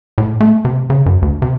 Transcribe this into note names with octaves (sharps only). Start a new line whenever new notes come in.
A2
A3
C3
C#3
F#2
D2
C3